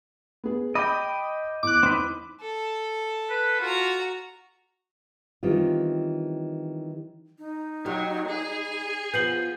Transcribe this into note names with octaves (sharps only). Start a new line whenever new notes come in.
B3 G#4
D#5 G5 B5 D6
E2 D6 F#6
C4 D#4 B4
A4
B4
F4 F#4 A#5
D#3 E3 G3 C4 C#4 F4
D#4
F#3 G3
G#4 G#5
F3 B3 G6 C7 F#7